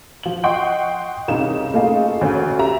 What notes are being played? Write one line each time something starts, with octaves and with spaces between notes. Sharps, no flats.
F3 F#7
D#5 F#5 G5 C6 C#6
C2 C#3 D#4 A#4 E7
A3 A#3 F4 G#4 D#5
D2 C#4 A4
G4 E5 A#5